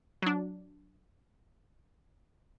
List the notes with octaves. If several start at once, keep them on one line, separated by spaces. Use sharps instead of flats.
F#3 D4